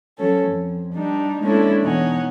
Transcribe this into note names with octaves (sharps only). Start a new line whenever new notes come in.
F#3 C#4 A4
F2
G3 D4 D#4
G#3 A#3 C#4 D4 E4 A4
E2 B2 D#4 C#5 F#5 G#5